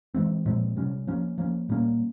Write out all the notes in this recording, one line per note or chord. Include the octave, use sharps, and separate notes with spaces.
E3 G#3 C4
A#2 F3 G#3 C4
C3 G3 C#4
F3 A#3 C#4
F3 A#3 C#4
A#2 G3 A#3 C#4